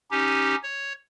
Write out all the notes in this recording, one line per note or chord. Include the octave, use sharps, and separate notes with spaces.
C#4 D#4 G4
C#5